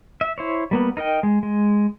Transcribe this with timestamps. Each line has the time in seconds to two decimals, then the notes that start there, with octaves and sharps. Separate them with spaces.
0.21 E5
0.38 E4 C5 C#5
0.71 G3 A#3 B3
0.97 D#4 A#4 D#5 G5
1.23 G#3
1.43 G#3